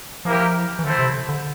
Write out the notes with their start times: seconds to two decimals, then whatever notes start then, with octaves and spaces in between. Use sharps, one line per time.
0.25 F3 A#3 E4 G4 A#4
0.79 E3
0.84 D3 A3 C4 E4 A4 C5
0.99 C3
1.29 D3